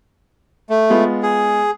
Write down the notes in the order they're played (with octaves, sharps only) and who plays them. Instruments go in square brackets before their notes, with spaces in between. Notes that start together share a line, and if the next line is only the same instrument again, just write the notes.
[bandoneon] A3
[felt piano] G#3 B3 F4
[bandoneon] G#4